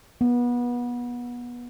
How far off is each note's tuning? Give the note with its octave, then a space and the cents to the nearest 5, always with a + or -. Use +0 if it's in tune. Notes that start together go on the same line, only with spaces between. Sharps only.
B3 -25